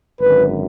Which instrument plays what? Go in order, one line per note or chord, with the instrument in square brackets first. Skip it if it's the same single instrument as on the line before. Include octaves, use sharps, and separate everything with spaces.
[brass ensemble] G#1 F#2 D3 B4